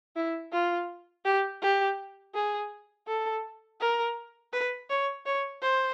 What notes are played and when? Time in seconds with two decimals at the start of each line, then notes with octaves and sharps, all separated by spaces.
0.16 E4
0.52 F4
1.25 G4
1.62 G4
2.35 G#4
3.08 A4
3.81 A#4
4.53 B4
4.90 C#5
5.26 C#5
5.62 C5